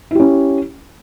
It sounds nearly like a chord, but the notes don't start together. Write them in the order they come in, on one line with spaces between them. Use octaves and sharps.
E4 G4 C#4